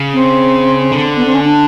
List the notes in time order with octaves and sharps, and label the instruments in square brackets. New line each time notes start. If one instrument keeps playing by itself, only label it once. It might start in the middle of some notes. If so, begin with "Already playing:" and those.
Already playing: [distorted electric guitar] C#3
[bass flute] C4
[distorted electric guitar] D3
[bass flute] B3
C4
C#4
D4